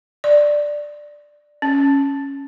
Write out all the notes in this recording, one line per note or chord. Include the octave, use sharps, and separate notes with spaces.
D5
C#4